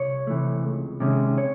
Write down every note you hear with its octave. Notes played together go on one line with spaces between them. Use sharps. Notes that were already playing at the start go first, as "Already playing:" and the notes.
Already playing: C2 C#5
C3 E3 A3
C#2
C3 D#3 G#3 C#4
C#5